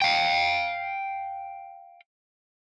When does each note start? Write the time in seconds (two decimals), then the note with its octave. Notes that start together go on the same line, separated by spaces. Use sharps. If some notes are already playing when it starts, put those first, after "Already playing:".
0.02 F5 G5